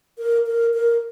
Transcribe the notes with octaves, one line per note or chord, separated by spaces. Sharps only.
A#4
A#4
A#4